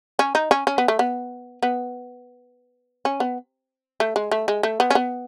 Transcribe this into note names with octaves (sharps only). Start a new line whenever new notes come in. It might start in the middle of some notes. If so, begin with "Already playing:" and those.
C#4
D#4
C#4
C#4
B3
A3
B3
B3
C#4
B3
A3
G#3
A3
G#3
A3
B3
C#4
B3